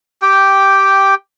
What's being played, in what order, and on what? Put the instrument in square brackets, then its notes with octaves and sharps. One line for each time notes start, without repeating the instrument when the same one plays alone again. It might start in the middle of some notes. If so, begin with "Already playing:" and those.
[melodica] G4 G5